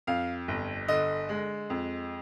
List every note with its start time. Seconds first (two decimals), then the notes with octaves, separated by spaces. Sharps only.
0.07 F2 F5
0.48 G1
0.88 D3 D#5
1.29 G#3
1.70 F2